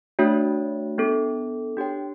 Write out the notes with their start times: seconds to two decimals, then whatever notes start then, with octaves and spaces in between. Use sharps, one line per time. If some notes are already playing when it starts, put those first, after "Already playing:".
0.19 A3 D4 F#4 C#5 E5
0.98 B3 D4 A4
1.77 D4 G4 C#5 G5